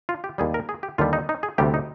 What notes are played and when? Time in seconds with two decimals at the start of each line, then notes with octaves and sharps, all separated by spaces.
0.09 F4
0.24 G4
0.38 D#2 D#3 G3 G#4
0.54 A#4
0.69 G#4
0.83 G4
0.98 D#2 D3 G3 F4
1.13 D#4
1.29 D#4
1.43 G#4
1.58 D2 C3 G3 G4
1.74 D#4